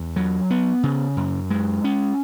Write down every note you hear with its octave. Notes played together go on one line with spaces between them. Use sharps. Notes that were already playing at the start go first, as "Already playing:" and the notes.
Already playing: E2
F#3
B3
C#3
F#2
G#3
C#4